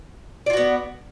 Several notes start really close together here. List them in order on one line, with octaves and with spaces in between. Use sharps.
D5 F4 F#4 B3